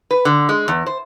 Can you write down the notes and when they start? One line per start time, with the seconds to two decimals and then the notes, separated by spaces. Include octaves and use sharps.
0.11 B4
0.25 D3
0.49 G#3
0.68 E2
0.86 C5